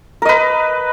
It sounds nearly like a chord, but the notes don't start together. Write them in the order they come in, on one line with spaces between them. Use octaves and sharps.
A#4 D#5 B4